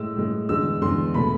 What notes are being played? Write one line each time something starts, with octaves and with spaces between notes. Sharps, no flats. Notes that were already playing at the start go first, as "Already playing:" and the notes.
Already playing: A2 G#3 E6
A2 G#3
E2 D3 G#3 E6
E2 D3 G#3 C6
B2 A3 B5